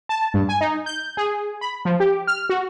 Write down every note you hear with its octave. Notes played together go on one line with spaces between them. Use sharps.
A5
G2
G#5
D#4
G6
G#4
B5
F3
G4
F6
F#4